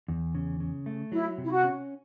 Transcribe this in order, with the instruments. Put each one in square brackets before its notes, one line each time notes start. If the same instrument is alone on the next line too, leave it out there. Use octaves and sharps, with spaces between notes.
[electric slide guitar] E2
C#3
C#3
A3
[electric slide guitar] F#3 [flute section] E4
[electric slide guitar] C3
[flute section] E4
F#4
[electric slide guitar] C#4